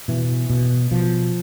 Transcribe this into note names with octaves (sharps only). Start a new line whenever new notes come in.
B2 E3
B2
B2 F3